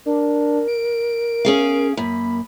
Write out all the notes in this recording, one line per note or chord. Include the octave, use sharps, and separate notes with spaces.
D4 A#4
D7
C#4 G#4 F5
F#2 A#3 B5